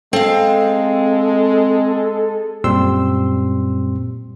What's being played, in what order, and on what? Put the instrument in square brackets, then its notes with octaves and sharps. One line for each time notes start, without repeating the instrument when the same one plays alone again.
[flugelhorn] G#3 [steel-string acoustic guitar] C4 F5 [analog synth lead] A4
[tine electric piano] F#2 A#2 G3 C4 C6 E6